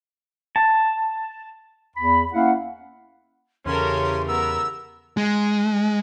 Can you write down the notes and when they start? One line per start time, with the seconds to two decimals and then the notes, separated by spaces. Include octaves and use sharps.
0.56 A5
1.97 E2 B5
2.33 A#3 C#4 E4 F5 F#5
3.66 E2 C#3 E3 C#4 G4 A4 A#4 C6
4.28 B3 A#4 E6
5.17 G#3